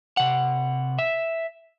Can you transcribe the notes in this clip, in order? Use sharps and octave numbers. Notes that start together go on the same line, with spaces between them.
C3 F#5
E5